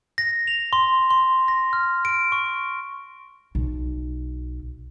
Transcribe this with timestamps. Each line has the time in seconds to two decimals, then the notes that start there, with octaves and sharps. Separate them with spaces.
0.18 A#6
0.47 F7
0.73 C6
1.10 C6
1.48 A#6
1.73 F6
2.05 D7
2.32 C#6
3.55 B1